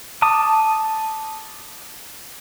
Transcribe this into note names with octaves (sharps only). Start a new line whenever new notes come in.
A5 D6 D#6